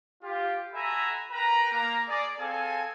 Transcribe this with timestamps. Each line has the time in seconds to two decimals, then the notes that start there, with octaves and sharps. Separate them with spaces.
0.22 F4 G4
0.74 F#4 A4 E5 G#5 A#5 B5
1.31 A#4 B4 G5 A#5
1.72 A#3 A#5
2.08 G#4 D5
2.38 C4 G#4 A4 F5 G#5